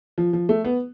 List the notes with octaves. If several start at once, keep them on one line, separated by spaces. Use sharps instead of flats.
F3
F3
A3
B3